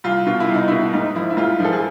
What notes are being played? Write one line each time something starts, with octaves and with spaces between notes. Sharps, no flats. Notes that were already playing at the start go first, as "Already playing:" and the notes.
C2 F4
B2 F4
E4
C2
D#4
B2 E4
G#2 D#4
F3 E4
E4
G#2 F4
F3 A4
G#4